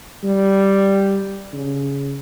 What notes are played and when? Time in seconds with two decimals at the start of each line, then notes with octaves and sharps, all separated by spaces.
0.23 G3
1.53 C#3